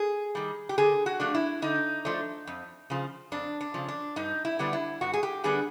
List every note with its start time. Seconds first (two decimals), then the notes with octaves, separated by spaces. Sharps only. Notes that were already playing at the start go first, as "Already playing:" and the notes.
Already playing: G#4
0.35 D#3 G3
0.69 G4
0.78 D3 G#4
1.06 F#4
1.20 F3 A3 D4
1.35 E4
1.62 D3 D#4
2.05 F3 A3 D4
2.47 F2
2.90 C#3 F3
3.32 F2 D4
3.61 D4
3.74 C#3 F3
3.88 D4
4.16 G2 D#4
4.45 E4
4.59 D3 G3 B3 D4
4.73 E4
5.01 G2 F#4
5.14 G#4
5.23 G4
5.44 D3 G3 B3 D4 G#4